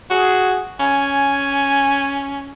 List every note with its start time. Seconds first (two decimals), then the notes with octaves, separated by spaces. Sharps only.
0.11 F#4 G#4
0.80 C#4 G#5